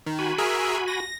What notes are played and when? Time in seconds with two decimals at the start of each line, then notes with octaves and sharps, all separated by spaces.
0.06 D#3
0.19 F#4 G#5 B5
0.38 G#4 A#4 E5
0.88 A#6